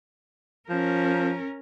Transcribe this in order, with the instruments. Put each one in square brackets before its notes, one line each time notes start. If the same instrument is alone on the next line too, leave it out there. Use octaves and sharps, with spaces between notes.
[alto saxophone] F3 [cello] C#4 A#4